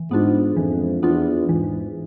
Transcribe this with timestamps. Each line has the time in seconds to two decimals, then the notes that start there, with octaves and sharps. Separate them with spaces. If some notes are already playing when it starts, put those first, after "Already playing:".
Already playing: E3
0.11 G#2 B3 D4 F4
0.56 F2 E3
1.03 E2 B3 D4 F4
1.49 G#2 E3